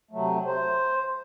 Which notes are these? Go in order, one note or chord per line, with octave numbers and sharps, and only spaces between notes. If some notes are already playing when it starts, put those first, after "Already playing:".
C3 F#3 A3
C5